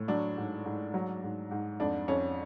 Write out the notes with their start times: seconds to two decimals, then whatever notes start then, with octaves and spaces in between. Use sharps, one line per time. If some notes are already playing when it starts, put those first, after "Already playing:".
Already playing: A2
0.08 F#3 D4
0.37 G#2
0.65 G#2
0.94 F#3
1.23 G#2
1.51 G#2
1.80 F2 D4
2.08 F2 C#4